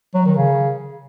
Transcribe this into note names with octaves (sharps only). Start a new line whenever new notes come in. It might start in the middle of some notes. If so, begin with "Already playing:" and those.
F#3
D#3
C#3